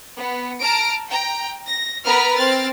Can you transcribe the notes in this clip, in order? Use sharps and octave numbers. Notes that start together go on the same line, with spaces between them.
B3
A5 A#5 F6 A#6 D7
G5 A#5
A#6
B3 A#4 B4 A#5 F6
C4 F6 A6